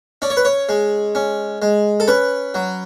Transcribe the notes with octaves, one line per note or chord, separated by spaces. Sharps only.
C#4 D5
C#5
B4
C#5
G#3
C#4
G#3
A4
C#4 B4
F#3